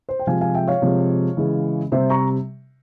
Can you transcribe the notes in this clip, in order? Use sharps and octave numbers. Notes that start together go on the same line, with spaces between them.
C5
G5
C3 F3 G#3 F5 G#5
F5 G#5
E5 G5
C#5 F5
C3 F3 G#3
C#3 E3 G#3
C3 G3 C5 E5
A#5 C#6